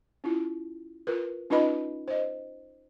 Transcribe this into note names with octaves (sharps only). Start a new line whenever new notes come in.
C#4 E4 F4
F4 A#4 B4
C#4 D#4 F4 B4 D#5 B5
C5 D#5